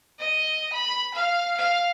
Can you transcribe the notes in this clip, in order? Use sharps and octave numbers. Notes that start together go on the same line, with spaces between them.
D#5
B5
F5
F5